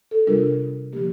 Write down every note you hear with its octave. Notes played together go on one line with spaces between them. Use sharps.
A4
C3 G3 D4 F4 A#4
D3 F3 A#3 G4